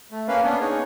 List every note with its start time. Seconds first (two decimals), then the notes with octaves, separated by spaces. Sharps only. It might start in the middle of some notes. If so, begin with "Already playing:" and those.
0.11 A3
0.28 A#3 C#4 B4 F5
0.43 B3 C#4 D4
0.61 D#4 G#4 C#5